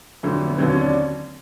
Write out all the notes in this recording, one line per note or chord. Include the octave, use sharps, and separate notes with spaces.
F2 D3 F#3 A3
B3
D#2 D3 F#3 C4
C#4
D4